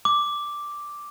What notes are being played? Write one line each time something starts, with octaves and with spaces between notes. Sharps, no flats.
D6